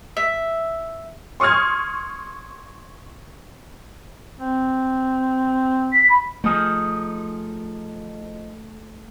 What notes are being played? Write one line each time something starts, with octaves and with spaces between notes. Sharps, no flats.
E5
C6 C#6 D#6 F6 G#6
C4
B6
B5
F3 A3 D#4 G#4